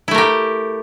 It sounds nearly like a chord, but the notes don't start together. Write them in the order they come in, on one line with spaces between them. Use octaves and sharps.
E4 A3 A#4 G4